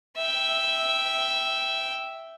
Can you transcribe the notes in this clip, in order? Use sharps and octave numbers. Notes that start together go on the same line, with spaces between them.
E5 G5